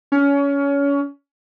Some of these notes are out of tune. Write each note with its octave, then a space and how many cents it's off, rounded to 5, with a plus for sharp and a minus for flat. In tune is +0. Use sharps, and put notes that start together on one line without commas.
C#4 +25